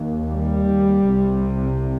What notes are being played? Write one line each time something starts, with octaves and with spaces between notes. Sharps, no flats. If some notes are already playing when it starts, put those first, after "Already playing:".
Already playing: D#2
G3
C2 C3